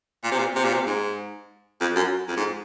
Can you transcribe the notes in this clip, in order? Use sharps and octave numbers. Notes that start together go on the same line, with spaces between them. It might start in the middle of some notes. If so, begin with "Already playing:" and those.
A#2
C3
A#2
C3
A#2
C3
G#2
F2
F#2
F2
G#2